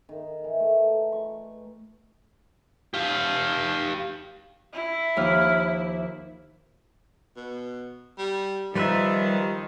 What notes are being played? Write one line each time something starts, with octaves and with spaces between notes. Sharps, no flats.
D#3
E3
A3
C#6
G4 F5
E4
D#2 F3 F6
B2
G3
D#3 F3 G3 B4 E5